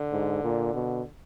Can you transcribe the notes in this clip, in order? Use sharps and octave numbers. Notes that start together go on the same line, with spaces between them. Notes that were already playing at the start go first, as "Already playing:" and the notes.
Already playing: D3
G#2
A#2
B2